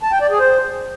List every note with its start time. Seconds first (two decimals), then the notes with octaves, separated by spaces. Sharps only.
0.03 A5
0.12 G5
0.21 D5
0.30 G#4
0.39 C5